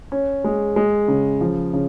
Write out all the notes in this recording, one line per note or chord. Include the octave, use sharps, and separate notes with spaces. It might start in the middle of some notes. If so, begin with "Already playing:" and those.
C#4
G#3
G#3
C#3
F3
C#3